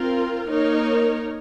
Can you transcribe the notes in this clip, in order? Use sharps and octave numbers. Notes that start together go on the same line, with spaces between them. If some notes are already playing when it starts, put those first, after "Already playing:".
Already playing: C4 F4 A#4
A#3 D#4 A#4 C#5